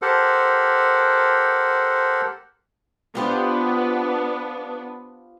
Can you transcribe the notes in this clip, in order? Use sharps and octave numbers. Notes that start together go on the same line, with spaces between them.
G4 A4 A#4 C5 F#5
B3 D4 F4 G4 C5